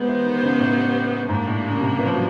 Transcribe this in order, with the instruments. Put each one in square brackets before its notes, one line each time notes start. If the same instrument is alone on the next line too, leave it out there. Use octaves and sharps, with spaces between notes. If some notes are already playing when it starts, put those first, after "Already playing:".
Already playing: [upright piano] G#3 [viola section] B3 D#4 G4 C5
[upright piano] E3
D#3
C#3
A2
[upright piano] G#2 [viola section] G3 A#3 D4
[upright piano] A2
C#3
C3
E3
F3
F#3